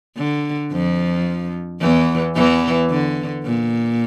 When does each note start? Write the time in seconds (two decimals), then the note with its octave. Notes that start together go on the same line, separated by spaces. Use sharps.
0.17 D3
0.72 F2 F3
1.81 E2 E3
2.35 E2 E3
2.90 D3
3.44 A#2